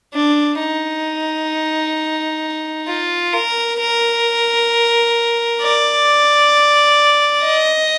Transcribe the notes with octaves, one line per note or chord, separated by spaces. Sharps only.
D4
D#4
F4
A#4
A#4
D5
D#5